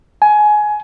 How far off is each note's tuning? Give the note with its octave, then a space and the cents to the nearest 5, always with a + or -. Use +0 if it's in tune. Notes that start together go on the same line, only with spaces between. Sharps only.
G#5 +20